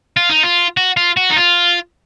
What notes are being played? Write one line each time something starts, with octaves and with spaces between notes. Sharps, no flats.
F4
D#4
F4
F#4
F4
F#4
D#4
F4